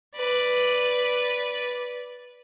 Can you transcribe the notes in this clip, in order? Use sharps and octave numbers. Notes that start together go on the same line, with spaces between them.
B4 D5